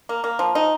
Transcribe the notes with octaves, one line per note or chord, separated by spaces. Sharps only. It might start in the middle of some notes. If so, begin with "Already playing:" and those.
A#3
A#3
F3
D#4